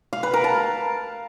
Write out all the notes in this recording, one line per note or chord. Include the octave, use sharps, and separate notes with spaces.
F5
B4
A#4
A5